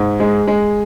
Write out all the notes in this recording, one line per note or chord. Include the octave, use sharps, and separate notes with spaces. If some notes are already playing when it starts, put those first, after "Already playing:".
Already playing: G#2
G#3
G#3